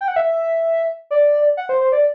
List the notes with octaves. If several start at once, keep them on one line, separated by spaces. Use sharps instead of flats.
G5
F#5
E5
D5
F#5
C5
C5
D5